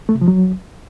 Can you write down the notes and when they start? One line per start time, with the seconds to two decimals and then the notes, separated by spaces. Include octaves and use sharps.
0.09 A3
0.15 C3
0.21 F3
0.28 F#3